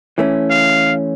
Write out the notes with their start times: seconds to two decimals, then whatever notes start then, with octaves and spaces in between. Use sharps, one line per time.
0.18 E3 A3 C#4
0.50 F5